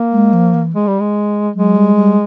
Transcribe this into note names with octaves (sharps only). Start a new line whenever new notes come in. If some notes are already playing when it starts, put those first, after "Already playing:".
Already playing: A#3
G#3
F3
E3
G#3
G3
G#3
F#3 G#3
G3
G3